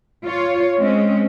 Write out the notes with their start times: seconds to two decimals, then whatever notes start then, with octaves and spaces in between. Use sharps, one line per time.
0.23 F4 C#5
0.78 G#3 C4 C#4